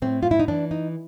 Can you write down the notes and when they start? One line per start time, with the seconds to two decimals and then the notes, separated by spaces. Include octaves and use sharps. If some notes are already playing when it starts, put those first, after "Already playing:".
0.02 A2 C4
0.23 F4
0.31 E4
0.39 D#4
0.48 E3 D4
0.71 D#4